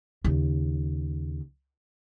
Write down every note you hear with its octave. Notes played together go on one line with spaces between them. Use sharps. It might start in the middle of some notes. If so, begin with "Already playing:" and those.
D#2 C#3